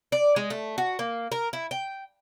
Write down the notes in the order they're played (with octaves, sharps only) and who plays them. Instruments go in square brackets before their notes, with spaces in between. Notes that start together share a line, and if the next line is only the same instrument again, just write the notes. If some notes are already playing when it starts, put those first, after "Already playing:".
[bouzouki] D5
G#3
A3
F#4
A#3
A#4
E4
G5